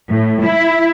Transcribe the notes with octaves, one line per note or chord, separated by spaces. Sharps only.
A2
E4